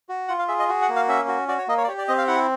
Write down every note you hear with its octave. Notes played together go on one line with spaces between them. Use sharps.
F#4
F4 F#5
F5
G#4 E5
D#5
F#4
F#5
A#3
F5
C#4 E5
F#4
F#4 D5
C#5
A#3 D#5
C#5
D5
G4 C#5
D5
C4 D#5
F5
E4 F#5